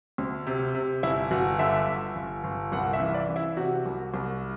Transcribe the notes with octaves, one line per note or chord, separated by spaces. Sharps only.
D2
C3
C3
G1 E4
G1 F#4
D3 E5
G1
G1
G1
C2 F#5
E5
E3
D5
E3
E4
C3 F#4
C2
C2